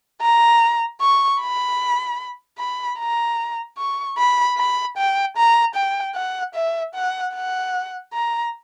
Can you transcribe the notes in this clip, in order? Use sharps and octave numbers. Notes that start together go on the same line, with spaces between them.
A#5
C#6
B5
B5
A#5
C#6
B5
B5
G5
A#5
G5
F#5
E5
F#5
F#5
A#5